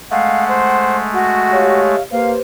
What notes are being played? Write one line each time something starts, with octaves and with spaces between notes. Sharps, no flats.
G#3 A3 F5 F#5
C5
F#4
G4 C#5 F5
A#3 G4 B4 C5 F5